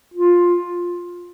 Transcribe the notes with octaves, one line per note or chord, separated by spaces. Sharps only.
F4